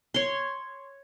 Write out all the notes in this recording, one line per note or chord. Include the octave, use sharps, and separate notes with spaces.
C#5 C6